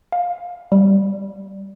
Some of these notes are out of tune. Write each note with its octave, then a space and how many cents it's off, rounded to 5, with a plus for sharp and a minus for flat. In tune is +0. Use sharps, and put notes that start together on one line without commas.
F5 +20
G3 +0